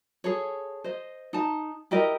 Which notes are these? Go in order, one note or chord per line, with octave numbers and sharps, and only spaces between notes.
G#4 A4 C#5
C5 D#5
D#4 A5
E4 G4 A#4 D#5